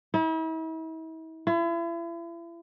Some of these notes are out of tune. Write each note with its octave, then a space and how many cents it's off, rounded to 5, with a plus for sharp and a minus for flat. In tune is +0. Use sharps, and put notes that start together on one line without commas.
E4 -40
E4 +40